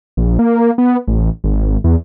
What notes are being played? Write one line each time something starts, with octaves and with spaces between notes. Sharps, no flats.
A#1
A#3
B3
A1
G#1
E2